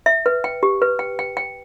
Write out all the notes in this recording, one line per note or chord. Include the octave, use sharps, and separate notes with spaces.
E5
B4
G5
G4
B4
G5
G5
G5